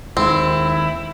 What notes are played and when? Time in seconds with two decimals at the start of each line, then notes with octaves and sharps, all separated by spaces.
0.17 D#2 D#3 G#3 C4 E4